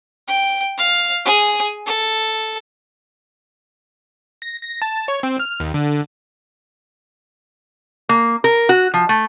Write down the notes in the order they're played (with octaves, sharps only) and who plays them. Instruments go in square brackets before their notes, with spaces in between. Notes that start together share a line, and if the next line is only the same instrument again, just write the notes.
[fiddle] G5
F5
G#4 G#5
A4
[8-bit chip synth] A#6
A#6
A5
C#5
C4
F6
D#2
D3
[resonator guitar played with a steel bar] A#3
A#4
F#4
F3
A3